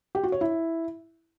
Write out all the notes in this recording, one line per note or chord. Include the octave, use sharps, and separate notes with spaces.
G4
F#4
C#5
E4